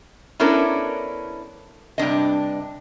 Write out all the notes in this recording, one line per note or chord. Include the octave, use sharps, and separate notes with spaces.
B3 C#4 D4 E4 A4 A#4
G2 C3 D4 D#5